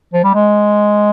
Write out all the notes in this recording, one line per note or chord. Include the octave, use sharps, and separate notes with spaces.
F3
G3
G#3